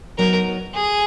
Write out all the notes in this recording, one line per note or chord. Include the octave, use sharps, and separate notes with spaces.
F#3 B3 D#4 A#4
G#4